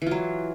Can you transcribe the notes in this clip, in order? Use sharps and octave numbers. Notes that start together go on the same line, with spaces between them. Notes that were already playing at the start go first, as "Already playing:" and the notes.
E3 F#3 F4